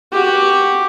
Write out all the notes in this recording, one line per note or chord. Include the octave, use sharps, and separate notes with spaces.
F#4 G4